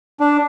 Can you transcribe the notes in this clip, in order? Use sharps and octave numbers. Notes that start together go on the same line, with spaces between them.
D4